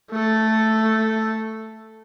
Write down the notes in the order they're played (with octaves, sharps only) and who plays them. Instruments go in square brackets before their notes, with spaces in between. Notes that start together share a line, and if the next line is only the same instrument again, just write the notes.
[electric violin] A3 A4